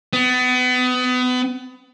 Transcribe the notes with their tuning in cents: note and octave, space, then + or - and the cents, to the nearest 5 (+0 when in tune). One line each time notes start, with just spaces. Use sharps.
B3 +30